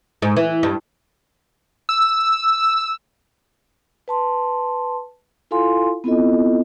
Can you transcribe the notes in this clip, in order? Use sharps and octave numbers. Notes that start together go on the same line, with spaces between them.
G#2
E3
G2
E6
B4 A5 C6
E4 F4 A4 F5 G#5 C6
B3 C4 E4 F4 A4 D#5